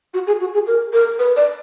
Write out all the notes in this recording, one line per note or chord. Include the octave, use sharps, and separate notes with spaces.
F#4
G#4
F#4
G#4
A#4
A#4
B4
D5